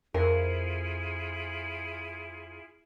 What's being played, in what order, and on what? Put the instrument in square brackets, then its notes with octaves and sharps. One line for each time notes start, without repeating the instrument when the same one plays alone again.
[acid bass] F2 [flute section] E4 F4 G#4 [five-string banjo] A#4